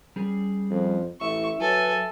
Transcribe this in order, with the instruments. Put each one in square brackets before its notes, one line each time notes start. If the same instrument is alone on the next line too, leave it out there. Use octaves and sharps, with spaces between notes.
[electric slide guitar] G3 C#4 G#4
[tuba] F2
[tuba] A1 [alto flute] E4 [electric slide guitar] E5 [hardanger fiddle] C#6
[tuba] F#3 [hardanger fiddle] A4 G#5 [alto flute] B4